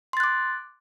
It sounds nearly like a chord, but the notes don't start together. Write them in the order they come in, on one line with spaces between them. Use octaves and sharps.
C6 A6 F#6 D6